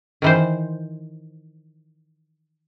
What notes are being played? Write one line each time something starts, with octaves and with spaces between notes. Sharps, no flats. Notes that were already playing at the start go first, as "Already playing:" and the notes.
D#3 E3 C5